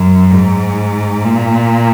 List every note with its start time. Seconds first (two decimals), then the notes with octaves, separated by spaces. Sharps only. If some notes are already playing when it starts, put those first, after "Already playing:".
Already playing: F#2
0.31 G#2
1.25 A#2